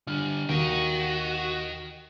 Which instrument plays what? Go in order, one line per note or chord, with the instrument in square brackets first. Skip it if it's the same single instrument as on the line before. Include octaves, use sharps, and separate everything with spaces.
[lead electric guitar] D3 G3 [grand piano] F6
[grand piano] D#2 [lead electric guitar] F#4 [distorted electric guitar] D#5 G5